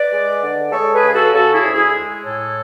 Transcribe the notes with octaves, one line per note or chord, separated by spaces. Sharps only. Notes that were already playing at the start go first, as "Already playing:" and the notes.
Already playing: B4 D5
G#3
D3
G#3 A4 C#5
G#4 B4
C#3 G#4
F#4 A4
C#3 F#4 A4
E4 G#4
D2
E4 G#4
G#3
A2 A4 C#5